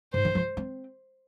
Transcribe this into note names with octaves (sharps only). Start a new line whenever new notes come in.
G#2 C5
D#3
F3
C4